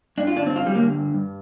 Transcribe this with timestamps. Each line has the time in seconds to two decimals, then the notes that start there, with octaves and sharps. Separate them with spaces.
0.18 G2 D4
0.27 F4
0.36 D3 D4
0.47 C4
0.56 G2 F4
0.67 G3
0.75 D3 A#3
0.95 G2
1.14 G2